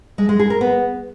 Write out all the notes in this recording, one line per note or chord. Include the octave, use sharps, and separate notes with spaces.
G#3
G#3
G#4
A#4
B3